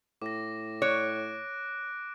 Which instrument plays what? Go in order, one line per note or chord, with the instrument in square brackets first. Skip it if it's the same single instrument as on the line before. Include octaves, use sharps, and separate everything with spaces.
[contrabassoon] A2 [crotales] D6 A#6
[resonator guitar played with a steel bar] C#5 [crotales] D6 F#6 D7